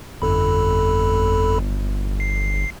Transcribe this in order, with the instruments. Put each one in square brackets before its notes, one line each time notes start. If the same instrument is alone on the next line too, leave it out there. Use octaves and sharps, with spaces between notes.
[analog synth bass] G1 [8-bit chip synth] F2 A4 B5
[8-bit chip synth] C7